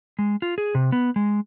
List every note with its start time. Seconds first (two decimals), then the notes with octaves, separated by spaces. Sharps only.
0.19 G#3
0.42 F4
0.58 G#4
0.75 C3
0.92 B3
1.16 G#3